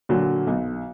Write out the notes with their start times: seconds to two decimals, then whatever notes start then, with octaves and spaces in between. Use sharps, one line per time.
0.09 A#2 D3 F#3
0.47 B1